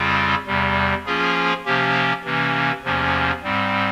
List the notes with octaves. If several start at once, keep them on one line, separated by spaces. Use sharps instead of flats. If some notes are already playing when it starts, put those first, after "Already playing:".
Already playing: F2 C#3 G3 C4 F4
E2 C3 G3
F3 A#3 C#4 F4 G#4
C3 F3 A#3 C#4 G4
C3 E3 A#3 C#4
E2 C3 F3 A#3 C#4
G#2 G3 C4